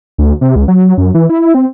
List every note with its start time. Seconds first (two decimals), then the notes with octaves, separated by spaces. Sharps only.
0.18 D2
0.41 C3
0.56 C#2
0.68 F#3
0.98 F#2
1.15 E3
1.30 E4
1.54 C4